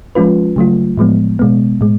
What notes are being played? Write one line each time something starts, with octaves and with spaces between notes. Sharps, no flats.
F3 G#3 C#4 F4 B4
C#3 F#3 A3 F4
A2 F3 G#3 B3
B2 G#3 B3
A2 G#3